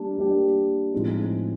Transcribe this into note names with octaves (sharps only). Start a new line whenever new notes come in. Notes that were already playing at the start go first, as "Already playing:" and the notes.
Already playing: G3 A#3 D4 G4
G3 A#3 D4 G4
A2 F3 G#3 C4 D#4